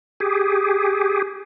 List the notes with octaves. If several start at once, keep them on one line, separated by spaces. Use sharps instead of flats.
G4 G#4